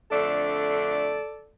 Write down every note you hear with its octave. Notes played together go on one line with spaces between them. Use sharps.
F2 D3 A3 D4 A4 D5